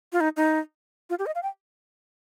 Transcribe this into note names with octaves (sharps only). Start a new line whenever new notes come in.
F4
D#4
D#4
F4
G4
D#5
F5
G5